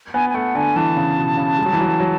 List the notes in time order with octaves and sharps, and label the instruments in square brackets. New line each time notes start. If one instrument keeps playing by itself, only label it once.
[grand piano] B3 [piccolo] G#5
[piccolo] G#5
[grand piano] A3 [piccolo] F#5
[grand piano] D3 [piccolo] G#5
[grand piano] E3 [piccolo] A5
[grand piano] C#3
B2
C#3
G#3
F#3
E3
F#3
F#3